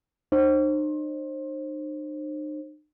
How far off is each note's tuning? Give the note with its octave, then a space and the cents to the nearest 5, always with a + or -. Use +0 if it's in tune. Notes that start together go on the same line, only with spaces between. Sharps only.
D#4 -45 C5 +30